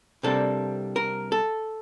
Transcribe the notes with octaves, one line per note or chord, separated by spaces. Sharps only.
C2 C3 G3 A#3 D4 A4
A#4
A4